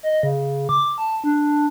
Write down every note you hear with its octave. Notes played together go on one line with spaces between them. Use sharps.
D#5
C#3
D6
A5
D4